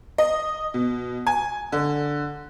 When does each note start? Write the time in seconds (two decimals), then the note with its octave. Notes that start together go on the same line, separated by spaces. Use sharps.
0.18 D#5
0.74 B2
1.27 G#5
1.72 D3